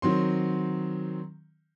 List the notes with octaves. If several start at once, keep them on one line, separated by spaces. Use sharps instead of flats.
D#3 F#3 C4 C6